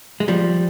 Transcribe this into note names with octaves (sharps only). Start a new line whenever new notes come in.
G#3
F3 G3